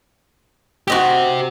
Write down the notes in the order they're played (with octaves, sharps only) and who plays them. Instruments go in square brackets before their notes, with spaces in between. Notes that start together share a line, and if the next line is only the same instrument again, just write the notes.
[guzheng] F#4 D#5 G5 [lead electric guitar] G4 C5